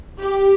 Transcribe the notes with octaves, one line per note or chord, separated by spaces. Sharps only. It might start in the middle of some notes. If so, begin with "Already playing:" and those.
G4